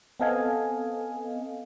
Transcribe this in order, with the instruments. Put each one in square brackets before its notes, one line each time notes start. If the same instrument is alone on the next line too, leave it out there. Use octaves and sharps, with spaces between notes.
[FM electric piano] B3 C4 A4 D#5 F5 G#5